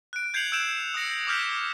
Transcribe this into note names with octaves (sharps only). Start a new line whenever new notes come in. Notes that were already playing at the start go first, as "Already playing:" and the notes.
F#6 D7
G6 G#6 C7 C#7 F7 F#7
E6 G6 D7 E7 F7
D#6 E6 A#6 C#7
D6 D#6 F6 G6 G#6 B6